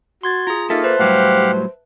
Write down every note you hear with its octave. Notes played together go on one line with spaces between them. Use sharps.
F#4 C6 G#6 A6
F4 G#4 A#5
A#3 D#4 F4 A4 E5 A6
B4 C5 E5 A5
A2 F#3 G3 G4 F5 F#5